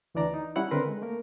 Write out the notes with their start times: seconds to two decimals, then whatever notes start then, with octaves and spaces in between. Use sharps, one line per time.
0.15 D2 E3 D4 D5 A#5
0.34 D#4
0.56 G3 C#4 E4 F#5 F#6
0.71 D3 C4 A#4 B4 A#5 C6
0.88 G#3
1.02 A3 A#3 A#4